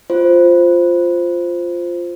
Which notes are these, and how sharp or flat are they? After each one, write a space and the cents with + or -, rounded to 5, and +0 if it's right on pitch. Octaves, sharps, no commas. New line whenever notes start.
F4 +0 C5 +0